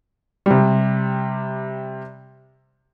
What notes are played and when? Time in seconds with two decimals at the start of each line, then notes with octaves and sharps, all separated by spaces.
0.46 C3 G3